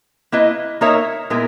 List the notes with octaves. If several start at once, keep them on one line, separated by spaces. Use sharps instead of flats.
A#3 E4 B4 D#5
A#3 D#4 A#4 C#5 E5
A#2 G#3 B3 E4 A#4